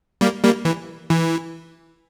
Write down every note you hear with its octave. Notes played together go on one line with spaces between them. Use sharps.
G3 A#3
G3 A#3
E3
E3